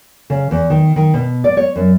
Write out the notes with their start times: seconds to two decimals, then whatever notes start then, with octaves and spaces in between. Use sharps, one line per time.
0.30 C#3
0.51 E2
0.70 D#3
0.96 D#3
1.14 B2
1.44 D5
1.57 C#5
1.76 F#2